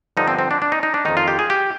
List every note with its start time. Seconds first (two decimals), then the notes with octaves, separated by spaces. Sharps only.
0.17 G2 D3 F3 D#4
0.28 C4
0.39 C4
0.51 D4
0.62 D4
0.72 D#4
0.83 D#4
0.94 D4
1.05 F2 D#3 D#4
1.17 F4
1.28 G4
1.39 G#4
1.50 G4